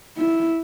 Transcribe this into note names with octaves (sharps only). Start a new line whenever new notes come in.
E4